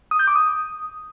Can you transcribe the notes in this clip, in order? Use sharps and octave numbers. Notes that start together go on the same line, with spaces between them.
D#6
G6
D6
D#6